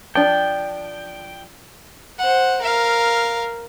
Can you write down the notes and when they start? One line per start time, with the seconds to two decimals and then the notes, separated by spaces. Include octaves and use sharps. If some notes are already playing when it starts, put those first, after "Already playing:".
0.15 F3 D4 G5
2.19 C5 F#5
2.61 A#4 F5